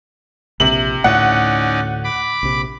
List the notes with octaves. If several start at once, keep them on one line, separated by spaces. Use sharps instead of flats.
A#1 C3 F#7
D2 A2 A3 C#4 D#4 D5 F#5
B5 D6
A#1 C3